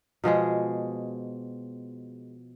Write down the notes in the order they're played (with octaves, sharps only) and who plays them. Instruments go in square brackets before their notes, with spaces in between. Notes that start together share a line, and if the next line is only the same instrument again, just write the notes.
[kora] B2 F3 G#3 G#4